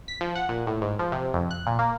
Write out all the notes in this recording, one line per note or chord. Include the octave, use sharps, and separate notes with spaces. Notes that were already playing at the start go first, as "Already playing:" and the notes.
B6
F3
F#5
A#2
A2
G#2
F3
C3
F2
F#6
A#2
A#3